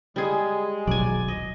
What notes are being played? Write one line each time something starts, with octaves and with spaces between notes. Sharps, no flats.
G3 G#3 G#4
D#1 B1 F#3 D5 G#5
D#5